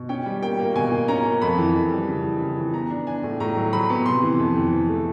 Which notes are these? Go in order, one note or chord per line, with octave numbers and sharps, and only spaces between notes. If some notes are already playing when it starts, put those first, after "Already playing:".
Already playing: B2
C#4 G5
G3
A#3 G5
A#3
B2 G#5
A#3
C#4 A#5
A#3
F2 B5
E3
F2
G3
C#3
E3
C#3
E3
B3 A#5
D4
D4 G#5
A2
A2 A#5
F#3
F#3 B5
B3
C3 C6
E3
F2
E3
E3
A3